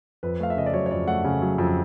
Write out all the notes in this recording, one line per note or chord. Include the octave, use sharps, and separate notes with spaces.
F2 B4
A3 F5
E5
C#3 D#5
D5
F#3 C#5
C#5
F2 D5
A3 F#5
C#3
F#3
F2